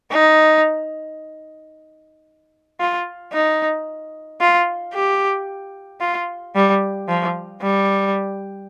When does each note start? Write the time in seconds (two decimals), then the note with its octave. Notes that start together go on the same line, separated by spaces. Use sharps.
0.11 D#4
2.80 F4
3.32 D#4
4.41 F4
4.94 G4
6.01 F4
6.55 G3
7.09 F3
7.62 G3